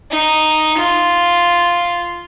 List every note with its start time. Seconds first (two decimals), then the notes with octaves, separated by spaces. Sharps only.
0.11 D#4
0.77 F4